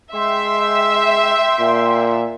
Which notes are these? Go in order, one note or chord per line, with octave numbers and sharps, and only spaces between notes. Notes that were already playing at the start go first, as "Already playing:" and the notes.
G#3 E5 G5 C6
A#2